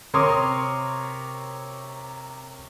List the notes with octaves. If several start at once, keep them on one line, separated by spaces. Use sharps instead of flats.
C3 A#4 C#5 C6 D6 D#6